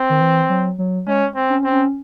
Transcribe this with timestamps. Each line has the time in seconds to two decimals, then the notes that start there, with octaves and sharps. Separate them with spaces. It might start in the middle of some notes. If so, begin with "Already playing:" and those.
Already playing: C4
0.10 D#3
0.21 E3
0.50 F#3
0.78 F#3
1.07 G#3 C#4
1.36 C4
1.50 C#4
1.64 C4
1.72 C#4